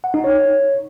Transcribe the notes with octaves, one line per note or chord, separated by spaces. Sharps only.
F#5
D#4
C#5